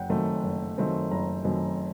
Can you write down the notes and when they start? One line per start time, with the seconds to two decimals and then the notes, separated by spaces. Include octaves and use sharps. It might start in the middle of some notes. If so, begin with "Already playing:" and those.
Already playing: F#1 F#5 G5
0.10 F#2 D#3 A3 C4
0.44 F#1
0.78 F#2 D#3 A3 C4
1.11 F#1 A#5
1.45 F#2 D#3 A3 C4